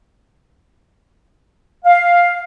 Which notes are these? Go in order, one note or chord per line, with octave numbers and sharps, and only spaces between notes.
F5